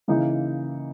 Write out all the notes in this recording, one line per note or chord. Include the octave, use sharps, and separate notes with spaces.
C#3 E3 A#3 D#4